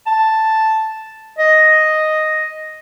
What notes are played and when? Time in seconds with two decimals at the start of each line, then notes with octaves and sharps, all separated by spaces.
0.07 A5
1.39 D#5